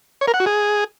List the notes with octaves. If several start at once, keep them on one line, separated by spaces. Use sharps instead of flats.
C#5
A#4
F#5
F#4
G#4